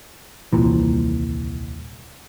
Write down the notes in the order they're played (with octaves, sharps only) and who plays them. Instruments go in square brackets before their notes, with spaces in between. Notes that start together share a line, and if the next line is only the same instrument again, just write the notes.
[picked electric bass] D#1 C2 A#2 E3